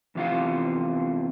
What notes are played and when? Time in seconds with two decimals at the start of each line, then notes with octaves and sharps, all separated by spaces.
0.15 E2 C3 F4 F5 F#5